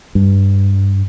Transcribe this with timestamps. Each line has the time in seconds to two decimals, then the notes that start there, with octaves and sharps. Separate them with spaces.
0.15 G2